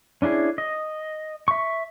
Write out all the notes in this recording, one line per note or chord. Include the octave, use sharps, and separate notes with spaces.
C#4 D4 E4 G#4
D#5
E5 C#6